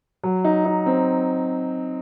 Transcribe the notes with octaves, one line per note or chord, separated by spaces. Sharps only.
F#3
D#4
D#4
C4